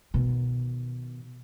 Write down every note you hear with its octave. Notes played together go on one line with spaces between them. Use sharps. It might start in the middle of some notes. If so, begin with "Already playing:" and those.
B2 D#3